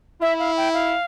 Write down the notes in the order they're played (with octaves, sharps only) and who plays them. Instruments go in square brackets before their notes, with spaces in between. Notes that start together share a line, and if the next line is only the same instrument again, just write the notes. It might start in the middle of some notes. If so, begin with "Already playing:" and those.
[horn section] E4 [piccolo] E5
[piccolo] F5
G5
F5